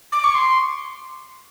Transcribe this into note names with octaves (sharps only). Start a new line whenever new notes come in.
D6
C#6
C6